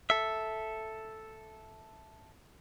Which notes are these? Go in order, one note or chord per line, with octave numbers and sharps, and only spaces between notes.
A4 E5